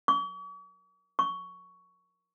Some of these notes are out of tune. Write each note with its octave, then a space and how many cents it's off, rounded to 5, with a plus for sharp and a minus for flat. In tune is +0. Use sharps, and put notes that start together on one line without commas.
C#6 +45
C#6 +10